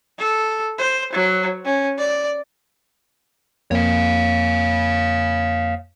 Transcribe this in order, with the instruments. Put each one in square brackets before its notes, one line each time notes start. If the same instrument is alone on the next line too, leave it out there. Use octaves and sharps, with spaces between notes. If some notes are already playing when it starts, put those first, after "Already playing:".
[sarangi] A4
C5
F#3
C#4
D5
[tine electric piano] F2 A#3 [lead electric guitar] C#5 F5